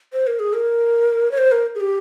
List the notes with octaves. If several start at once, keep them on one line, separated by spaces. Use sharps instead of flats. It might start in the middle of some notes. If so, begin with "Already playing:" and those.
C5
A#4
G#4
A#4
C#5
C5
A#4
G#4
G4